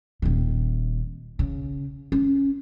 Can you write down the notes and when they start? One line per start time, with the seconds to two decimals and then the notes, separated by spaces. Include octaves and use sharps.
0.22 D#1 D#3
1.39 C#3
2.12 C#4